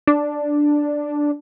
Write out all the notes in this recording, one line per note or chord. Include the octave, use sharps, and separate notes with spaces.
D4